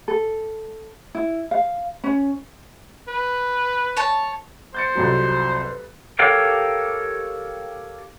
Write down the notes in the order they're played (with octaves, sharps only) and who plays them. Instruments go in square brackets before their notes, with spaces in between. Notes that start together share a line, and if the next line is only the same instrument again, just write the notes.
[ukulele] A4
E4
F5
C#4
[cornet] B4
[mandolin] C#5 A5
[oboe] C5 [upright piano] G6 A6 C#7
[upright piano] C2 F2 F#3
B4
[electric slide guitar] G4 A4 A#4 C#5 F5 G5